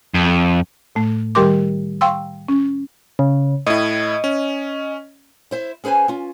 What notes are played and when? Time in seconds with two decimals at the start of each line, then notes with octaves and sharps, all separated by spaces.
0.14 F2
0.95 A2 A3
1.35 D#3 G3 G4 A#4 C6 D6
2.01 F5 G5 C6 C#6 E6
2.49 C#4
3.19 C#3
3.67 A2 E4 D#5
4.24 C#4
5.51 E4 C5 E5
5.84 C#4 G#4 B4 C5 G#5
6.08 C#4 F4